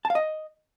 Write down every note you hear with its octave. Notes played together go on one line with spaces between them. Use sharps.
A5
F5
D#5